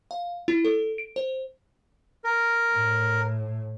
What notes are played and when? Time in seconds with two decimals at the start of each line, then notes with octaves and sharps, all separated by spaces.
0.11 F5
0.48 E4
0.65 A4
0.98 D7
1.16 C5
2.24 A#4
2.73 A2